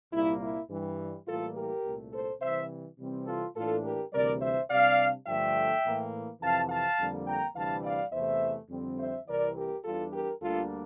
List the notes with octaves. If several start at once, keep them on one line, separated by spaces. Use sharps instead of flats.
C2 A#2 G3 A#3 E4
E4
G2 E3 G3
A2 E3 G3 A#3 F4 A4
G4 A#4
C2 A#2 A3
A4 C5
C3 E3 G3 C5 E5
C3 E3 G3 C4
F4 A4
A2 E3 A#3 D4 F4 A4
G4 A#4
D2 C3 E3 G3 A#4 D5
C5 E5
C3 G3 D4 D5 F5
G2 D3 F3 A3 D4 E5 G5
A2 E3 A#3
F2 C3 E3 F5 A5
F5 A5
F2 D3 G3 A#3 D4
G5 A#5
D2 C3 E3 G3 D4 F5 A5
D5 F5
E2 C3 E3 A3 C5 E5
F2 D3 G3 C4
C5 E5
C2 C3 E3 A#4 D5
G4 A#4
E2 E3 G3 D4 F4 A4
G4 A#4
D2 D3 G3 A#3 D4 F4 A4